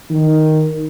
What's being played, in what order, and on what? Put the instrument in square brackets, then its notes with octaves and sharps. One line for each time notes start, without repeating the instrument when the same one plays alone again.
[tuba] D#3